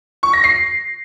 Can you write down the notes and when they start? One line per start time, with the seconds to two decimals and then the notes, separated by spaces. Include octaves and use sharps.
0.23 C#6
0.33 A#6
0.44 C7